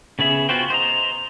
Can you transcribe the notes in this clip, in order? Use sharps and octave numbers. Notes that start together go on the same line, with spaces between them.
C#3 B3 G#4 E5
B3 F4 F#4 C5 G5
C5 D#5 A#5